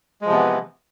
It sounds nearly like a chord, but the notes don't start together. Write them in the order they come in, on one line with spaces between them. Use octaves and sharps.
G#3 F3 C3 B3 E3